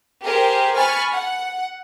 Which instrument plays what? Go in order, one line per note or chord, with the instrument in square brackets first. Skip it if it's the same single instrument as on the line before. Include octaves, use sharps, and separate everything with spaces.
[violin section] G4 G#4 A#4 C5
G#5 B5 C#6 F6 A6
F#5